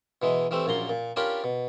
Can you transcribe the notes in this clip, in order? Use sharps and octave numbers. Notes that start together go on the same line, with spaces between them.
B2 E3 G#3
E3 G3 A3 C4
A#1 F#2 A#2 A#5 C6
A#2
C#4 D4 F4 G4 A#4 B5
B2